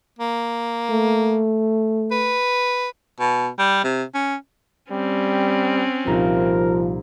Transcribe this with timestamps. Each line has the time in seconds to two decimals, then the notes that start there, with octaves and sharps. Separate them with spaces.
0.19 A#3
0.90 A3
2.12 B4
3.20 B2
3.59 G3
3.84 C3
4.15 C#4
4.91 G3 C4 C#4
6.07 C2 A#2 F3 D#4 A#4